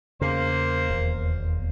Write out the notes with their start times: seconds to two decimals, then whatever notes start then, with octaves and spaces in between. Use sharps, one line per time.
0.21 E2 C#3 A#3 C5
0.90 E1 D#2